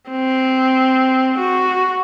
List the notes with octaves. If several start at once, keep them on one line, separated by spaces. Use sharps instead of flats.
C4
F#4